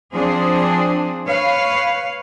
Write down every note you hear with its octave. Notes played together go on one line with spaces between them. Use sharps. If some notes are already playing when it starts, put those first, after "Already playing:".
F3 C4 D4 G#4
B4 C#5 F5